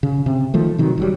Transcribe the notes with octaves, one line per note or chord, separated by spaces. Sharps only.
C#3
C3
D#3 F3 A3
C3 D#3 F#3
F#1 F#3 G3